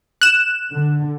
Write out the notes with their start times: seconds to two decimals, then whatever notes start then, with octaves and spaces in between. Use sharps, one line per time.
0.21 F#6 E7
0.71 D3